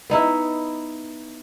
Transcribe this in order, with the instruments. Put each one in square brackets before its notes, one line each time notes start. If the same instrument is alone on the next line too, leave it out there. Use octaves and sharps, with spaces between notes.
[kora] B3 D#4 E4